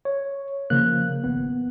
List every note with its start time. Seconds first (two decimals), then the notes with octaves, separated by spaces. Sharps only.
0.05 C#5
0.70 C#3 F3 A#3 F#6
1.24 G#1 B3